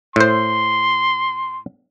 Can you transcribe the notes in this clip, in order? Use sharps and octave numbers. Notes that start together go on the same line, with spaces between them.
A2 C5 C6